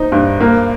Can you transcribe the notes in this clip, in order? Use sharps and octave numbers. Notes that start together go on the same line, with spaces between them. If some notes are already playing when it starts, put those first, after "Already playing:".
Already playing: D#4 C5
G2
A#3